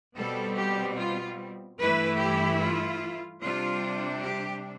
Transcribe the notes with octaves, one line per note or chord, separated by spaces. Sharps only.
B2 G3 C4 A4
G4
F4
G2 E3 A3 E4 B4
G4
F4
C3 G3 D4 F4
G4